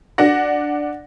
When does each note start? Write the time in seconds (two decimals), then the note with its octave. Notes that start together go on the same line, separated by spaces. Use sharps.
0.18 D4 F#5 A#6